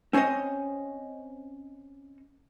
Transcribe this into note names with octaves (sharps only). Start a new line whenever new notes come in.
C4 C#4 C5 C#5 D#5